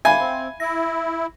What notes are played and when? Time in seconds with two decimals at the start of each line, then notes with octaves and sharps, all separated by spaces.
0.05 E5 F5 G#5 B5
0.20 C4
0.60 E4 A#6